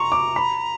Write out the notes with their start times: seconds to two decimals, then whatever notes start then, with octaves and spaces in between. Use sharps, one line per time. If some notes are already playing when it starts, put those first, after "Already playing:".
Already playing: A#5 C6 C#6
0.12 D6
0.36 B5